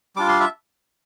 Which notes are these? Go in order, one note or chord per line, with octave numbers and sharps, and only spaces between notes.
G3 D4 F4 D6
C6
E5